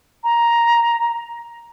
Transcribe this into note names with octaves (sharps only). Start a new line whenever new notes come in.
A#5